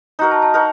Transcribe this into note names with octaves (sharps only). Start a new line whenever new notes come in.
D#4 F#4 A#4 A#5
A5
A5
D#4 F#4 A#4